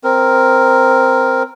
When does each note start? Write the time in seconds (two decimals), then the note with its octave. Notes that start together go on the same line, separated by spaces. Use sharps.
0.04 C4 A#4